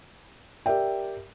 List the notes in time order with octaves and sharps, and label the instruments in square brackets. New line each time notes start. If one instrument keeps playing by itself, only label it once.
[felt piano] G4 A#4 D5 E5 G5